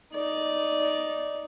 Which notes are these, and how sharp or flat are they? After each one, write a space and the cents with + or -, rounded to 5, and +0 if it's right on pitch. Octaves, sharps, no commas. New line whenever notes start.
D#4 +0 D5 -10